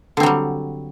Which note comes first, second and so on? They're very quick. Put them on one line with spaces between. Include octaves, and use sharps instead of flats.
D3 C4 F#3 G3